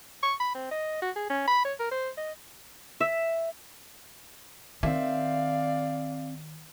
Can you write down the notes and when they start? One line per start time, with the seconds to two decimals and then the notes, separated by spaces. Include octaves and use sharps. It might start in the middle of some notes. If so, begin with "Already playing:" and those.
0.23 C#6
0.40 B5
0.55 C4
0.71 D#5
1.02 F#4
1.16 G#4
1.30 C#4
1.48 B5
1.65 C#5
1.79 A#4
1.91 C5
2.18 D#5
3.01 E5
4.83 D#3 C4 D5 E5 F5